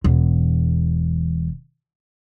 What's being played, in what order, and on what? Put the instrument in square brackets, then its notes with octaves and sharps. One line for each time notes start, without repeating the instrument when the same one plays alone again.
[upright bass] E1 E2